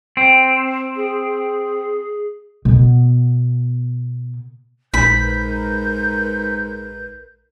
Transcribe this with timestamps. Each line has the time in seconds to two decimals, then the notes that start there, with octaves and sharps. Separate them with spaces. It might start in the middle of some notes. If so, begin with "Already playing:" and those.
0.17 C4
0.96 G#4
2.65 B2 B3
4.94 A#1 G#2 A#4 B4 B5 G6